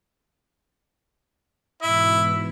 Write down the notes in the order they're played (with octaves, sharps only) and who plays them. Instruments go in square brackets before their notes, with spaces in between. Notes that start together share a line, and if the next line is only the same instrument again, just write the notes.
[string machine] G#2 B2 E3 [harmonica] E4 [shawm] E5